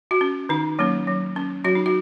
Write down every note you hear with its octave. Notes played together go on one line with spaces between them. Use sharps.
F#4
C#4
D#3 D#4
F#3 A#3 C#4
F#3
C#4
F#3 F#4
D#4
F#4